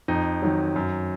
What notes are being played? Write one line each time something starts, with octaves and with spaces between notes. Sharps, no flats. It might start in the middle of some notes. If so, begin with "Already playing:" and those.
F2 D#4
D#3 F#3
F#2